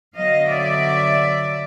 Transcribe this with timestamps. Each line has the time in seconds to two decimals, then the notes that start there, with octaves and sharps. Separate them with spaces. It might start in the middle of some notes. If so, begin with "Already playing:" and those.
0.16 D3 F#3 B3 D#5 F5
0.48 D5 E5